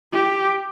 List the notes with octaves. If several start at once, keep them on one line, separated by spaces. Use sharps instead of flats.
G4